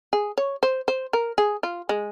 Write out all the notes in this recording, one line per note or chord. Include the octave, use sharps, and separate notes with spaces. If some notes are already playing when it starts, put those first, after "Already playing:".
G#4
C#5
C5
C5
A#4
G#4
F4
G#3